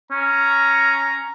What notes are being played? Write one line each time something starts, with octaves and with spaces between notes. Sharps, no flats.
C#4 A#5